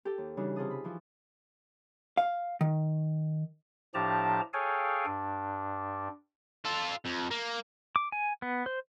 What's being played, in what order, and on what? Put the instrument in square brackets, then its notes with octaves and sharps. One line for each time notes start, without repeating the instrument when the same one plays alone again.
[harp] G4 A4 G5
D#2
C#3 E3 G3 D4 D#4 F#4
C3 F4 G#4 A5 D#6
B5
E3 F3 E4
[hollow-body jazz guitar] F5
D#3
[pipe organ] A2 F3 D4 G4 A5 A#5
G#4 A4 C#5 F5 G5 G#5
G2 D4
[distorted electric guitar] F4 A4
F2
A#3
[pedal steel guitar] D6
G#5
B3
C5